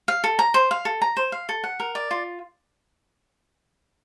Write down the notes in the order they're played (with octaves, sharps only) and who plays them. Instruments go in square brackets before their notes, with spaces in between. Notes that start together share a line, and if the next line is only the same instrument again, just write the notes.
[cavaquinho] F5
A4
A#5
C5
F5
A4
A#5
C5
F5
A4
F#5
A#4
D5
F4